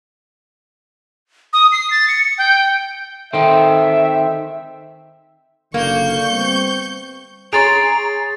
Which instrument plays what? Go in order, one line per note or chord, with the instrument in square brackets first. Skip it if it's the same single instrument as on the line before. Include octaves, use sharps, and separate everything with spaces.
[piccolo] D#6
C7
A6
C#7
G5
[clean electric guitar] D#3 C4 [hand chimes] A4 G5 [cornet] E5
[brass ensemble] F#1 D3 [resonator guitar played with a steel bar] A#3 [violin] C#6 G6
[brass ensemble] G3 B3 C4
[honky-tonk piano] G#4 C#5 C6 [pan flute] A#5 [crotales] A6 D7